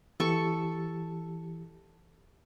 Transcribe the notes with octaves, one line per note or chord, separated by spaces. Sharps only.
E3 G4 A4 C#6